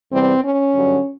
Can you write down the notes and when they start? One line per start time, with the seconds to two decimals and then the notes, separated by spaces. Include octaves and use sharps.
0.12 E2 C3 E3 G3 C4
0.43 C#4
0.75 G2 D3 F#3